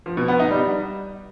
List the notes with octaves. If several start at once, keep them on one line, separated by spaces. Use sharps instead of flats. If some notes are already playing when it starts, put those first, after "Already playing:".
F3
B2
B3
D#4
G3